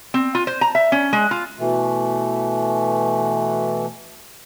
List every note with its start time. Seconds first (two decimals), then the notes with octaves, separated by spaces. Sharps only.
0.14 C4
0.35 F4
0.47 C5
0.61 A#5
0.75 E5
0.92 C#4
1.13 G#3
1.31 F4
1.59 B2 E3 A3